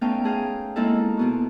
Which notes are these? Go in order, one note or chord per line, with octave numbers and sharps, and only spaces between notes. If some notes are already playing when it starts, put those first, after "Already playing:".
A3 B3 C#4 D#4 F5 G5
A3 G#4 F5 G5
G#3 A#3 C4 D#4 E4 A4
B2 B3 F#4